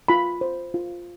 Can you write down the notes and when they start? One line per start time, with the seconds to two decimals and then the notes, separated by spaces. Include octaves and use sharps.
0.08 F4 B5
0.41 C5
0.74 F4